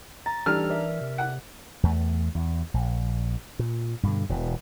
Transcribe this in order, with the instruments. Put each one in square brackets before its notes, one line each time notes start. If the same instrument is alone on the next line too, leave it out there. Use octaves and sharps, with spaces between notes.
[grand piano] A#5 [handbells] A6
[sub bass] E3 [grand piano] G3 A4 [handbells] D4 D#4 A#5 [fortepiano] F6
[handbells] A#4 E5 [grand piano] D5
[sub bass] C3
[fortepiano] F#5
[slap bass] E2 A3
E2
A#1
A#2
G2 B2 D3
E1 B2 E3